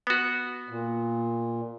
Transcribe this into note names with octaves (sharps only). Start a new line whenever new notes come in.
B3 F#4
A#2